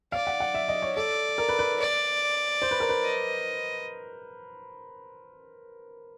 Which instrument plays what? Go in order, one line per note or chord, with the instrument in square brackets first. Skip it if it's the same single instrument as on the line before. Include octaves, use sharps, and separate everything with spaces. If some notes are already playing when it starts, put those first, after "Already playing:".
[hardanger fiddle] D5 [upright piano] F5
[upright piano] F#5
F#5
E5
D#5
C#5
[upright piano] A4 [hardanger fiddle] D5
[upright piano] A#4
B4
B4
[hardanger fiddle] D5
[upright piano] C5
B4
A#4
B4
[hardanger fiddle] D#5